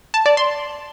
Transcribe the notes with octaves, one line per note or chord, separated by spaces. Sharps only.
A5
D5
C6